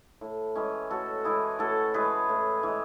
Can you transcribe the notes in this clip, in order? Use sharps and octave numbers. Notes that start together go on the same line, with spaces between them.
A2
E3 G#3 C#4
A2 F#4 A4
E3 G#3 E4 G#4
A2 F#4 A4
E3 G#3 G#4 B4
A2
E3 G#3